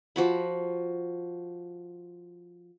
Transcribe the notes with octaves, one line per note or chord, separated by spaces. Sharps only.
F3 F#4 B5